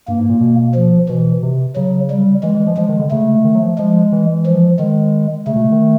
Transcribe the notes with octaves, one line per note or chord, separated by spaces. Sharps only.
G2 A#3
G#2
A#2
B2
F3
B2 E3
C3
C#3 F#3
G3
E3 G#3
E3
F3
F3 G#3
D#3
D3
C#3 A3
D#3
F#3
F3
F3 G#3
E3
F3
D#3 G#3
C#3 A3
B2
D#3